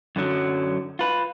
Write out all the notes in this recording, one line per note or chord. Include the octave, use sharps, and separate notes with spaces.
F#2 D3 F#3
F4 B4